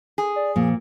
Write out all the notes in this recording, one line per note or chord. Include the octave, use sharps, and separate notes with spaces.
G#4
D5
A#2 F3